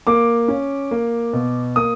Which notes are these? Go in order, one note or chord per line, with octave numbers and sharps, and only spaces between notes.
A#3 D6
C#4
A#3
B2
A#3 D#6